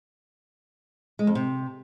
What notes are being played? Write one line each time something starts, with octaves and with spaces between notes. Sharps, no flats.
G#3
F2
C3